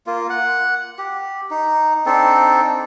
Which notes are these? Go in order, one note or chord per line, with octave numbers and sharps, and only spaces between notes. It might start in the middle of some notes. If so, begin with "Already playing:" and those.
A#3 F4
F#5
G4
D#4
C4 D4 D#4 A4